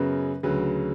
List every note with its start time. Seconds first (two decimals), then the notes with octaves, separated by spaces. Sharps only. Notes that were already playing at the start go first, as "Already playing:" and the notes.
Already playing: F#2 C#3 F#3 B3 B4
0.43 D2 C#3 F#3 B4